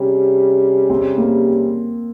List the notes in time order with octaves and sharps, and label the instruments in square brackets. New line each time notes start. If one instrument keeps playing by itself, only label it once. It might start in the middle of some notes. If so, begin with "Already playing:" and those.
Already playing: [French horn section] C3 G3 C#4 G#4
[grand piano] C4
A#3